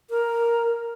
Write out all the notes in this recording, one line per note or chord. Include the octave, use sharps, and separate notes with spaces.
A#4